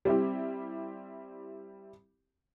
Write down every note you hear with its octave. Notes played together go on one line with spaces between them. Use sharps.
G3 C4 E4 G4